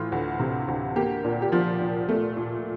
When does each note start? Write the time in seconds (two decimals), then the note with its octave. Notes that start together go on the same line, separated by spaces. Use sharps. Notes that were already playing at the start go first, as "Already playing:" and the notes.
Already playing: A2 E3 F4
0.12 D2
0.40 C3
0.68 D2
0.96 A#3 G4
1.25 A#2
1.42 G4
1.52 F3 F4
1.80 A#2
2.09 A3
2.37 A#2